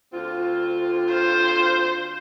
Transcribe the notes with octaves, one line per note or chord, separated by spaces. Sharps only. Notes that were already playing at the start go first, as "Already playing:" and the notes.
D2 C4 F4
C5